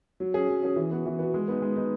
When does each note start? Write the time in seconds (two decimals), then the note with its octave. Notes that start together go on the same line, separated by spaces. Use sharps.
0.20 F#3
0.34 C#4 G#4
0.49 F#3
0.63 C#4 G#4
0.76 E3
0.91 B3 F#4
1.06 E3
1.19 B3 F#4
1.34 G#3
1.48 B3 D#4
1.62 G#3
1.76 B3 D#4